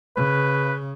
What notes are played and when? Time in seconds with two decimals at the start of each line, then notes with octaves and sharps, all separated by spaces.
0.17 C#3 B4